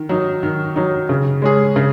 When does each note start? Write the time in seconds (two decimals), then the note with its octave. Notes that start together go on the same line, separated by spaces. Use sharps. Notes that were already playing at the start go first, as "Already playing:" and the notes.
Already playing: D#3
0.09 F#3 D#4
0.43 D#3
0.76 F#3 D#4
1.09 C#3
1.42 G#3 C#4 G#4
1.76 C#3